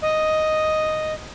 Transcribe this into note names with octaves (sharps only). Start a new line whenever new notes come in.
D#5